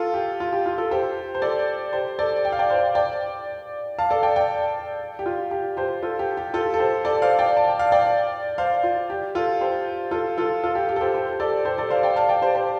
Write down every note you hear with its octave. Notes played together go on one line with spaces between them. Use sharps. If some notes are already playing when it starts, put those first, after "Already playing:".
Already playing: F4 A4
G4
F4
G4
F4
F4 A4
G4 C5
C5
A4 D5
G4 C5
A4 D5
G5
F5
D5 G5
C5 F5
D5 G5
F5 A5
A4 D5
D5 G5
D5 G5
G4
F4
G4
G4 C5
F4 A4
G4
G4
F4 A4
A4
G4 C5
A4 D5
C5 F5
D5 G5
A5
G5
F5
D5 G5
C5 F5
F4
G4
F4 A4
G4 C5
F4 A4
F4 A4
F4 A4
G4
G4
A4
G4 C5
G4 C5
A4 D5
G4 C5
A4 D5
C5 F5
D5 G5
F5 A5
D5 G5
G4 C5
G4 C5